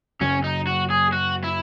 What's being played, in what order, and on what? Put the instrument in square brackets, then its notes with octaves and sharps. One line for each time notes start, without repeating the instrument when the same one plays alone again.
[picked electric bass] F#2 C#3 F#3 [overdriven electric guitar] C#4
[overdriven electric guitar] D#4
F#4
G#4
F#4
E4